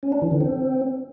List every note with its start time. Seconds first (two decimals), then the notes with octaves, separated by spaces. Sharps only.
0.03 C#4
0.12 D4
0.22 E3
0.31 D3
0.41 C4